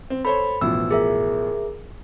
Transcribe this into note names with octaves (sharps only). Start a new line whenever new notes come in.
C4
A4 C5 C#5 B5
A1 B2 F3 E6
G#4 A#4 E5